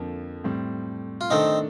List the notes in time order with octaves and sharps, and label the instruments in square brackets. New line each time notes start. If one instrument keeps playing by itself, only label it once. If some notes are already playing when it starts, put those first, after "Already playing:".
Already playing: [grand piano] F2 D3 F3 A#3
A2 G3 C4
[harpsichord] F4
[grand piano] D#3 A3 D4 A4 [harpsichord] C4 D#4